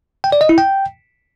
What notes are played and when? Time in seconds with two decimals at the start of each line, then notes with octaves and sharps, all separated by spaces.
0.24 G5
0.32 D5
0.41 D#5
0.49 E4
0.58 G5